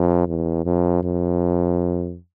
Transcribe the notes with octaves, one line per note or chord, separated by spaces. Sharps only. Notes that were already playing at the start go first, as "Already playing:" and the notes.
Already playing: F2
E2
F2
F2